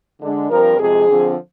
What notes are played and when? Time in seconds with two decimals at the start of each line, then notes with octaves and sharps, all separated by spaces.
0.21 D3 G#3 D4
0.50 G2 F3 C4 A#4
0.78 F2 C3 F3 G#3 G#4
1.08 D3 F3 C4